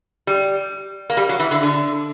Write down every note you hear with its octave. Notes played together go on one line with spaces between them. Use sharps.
G3
A#3
G3
F#3
E3
D3
D3